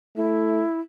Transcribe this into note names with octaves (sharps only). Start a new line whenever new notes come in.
A3 E4